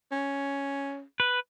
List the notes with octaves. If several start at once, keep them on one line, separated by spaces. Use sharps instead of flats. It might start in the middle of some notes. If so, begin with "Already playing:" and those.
C#4
B4